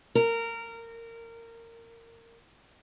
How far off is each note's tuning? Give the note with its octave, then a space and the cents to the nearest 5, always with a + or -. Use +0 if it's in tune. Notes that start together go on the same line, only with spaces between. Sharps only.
A#4 -20